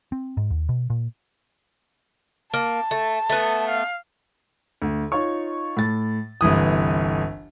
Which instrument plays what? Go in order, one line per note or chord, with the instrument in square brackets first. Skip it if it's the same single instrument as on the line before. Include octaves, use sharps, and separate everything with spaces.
[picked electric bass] C4
G#2
D#2
B2
A#2
[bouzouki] A#3 [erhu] A5
[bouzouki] A3
A3 B3
[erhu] F5
[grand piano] D2
D#4 F4 C#5 C#6
A2 A6
G1 C2 E3 D#6